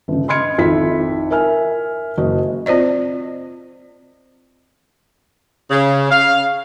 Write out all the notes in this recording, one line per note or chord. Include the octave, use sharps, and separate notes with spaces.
G1 C#3
D#5 B5 C6 F6 G#6 C#7
G#1 F2 E4 F4 B6
A#4 E5 G#5 F6
F#1 F#4 D#5
C4 F4 C5 D5 D#5
C#3
F5